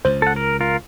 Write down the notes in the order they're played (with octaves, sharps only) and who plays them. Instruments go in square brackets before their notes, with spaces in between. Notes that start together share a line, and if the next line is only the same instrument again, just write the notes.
[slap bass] C#2 [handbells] C5
[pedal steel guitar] A4 F#5
A#4
F4 A#4